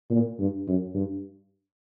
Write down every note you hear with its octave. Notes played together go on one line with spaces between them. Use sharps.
A#2
G2
F#2
G2